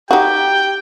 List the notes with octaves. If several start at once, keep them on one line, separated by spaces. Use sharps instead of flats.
D#4 F#4 G4 G5